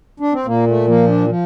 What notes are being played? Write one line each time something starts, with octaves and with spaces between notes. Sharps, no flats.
D4
C4
A#2 A#3
A3
F3 A#3
D4
F3